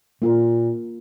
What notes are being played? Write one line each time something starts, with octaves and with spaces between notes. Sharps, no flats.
A#2 A#3 F4 A#4